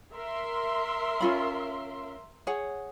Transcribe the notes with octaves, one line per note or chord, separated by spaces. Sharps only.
A#4 E5 C6
C#4 F4 B5
G#4 C#5 F#5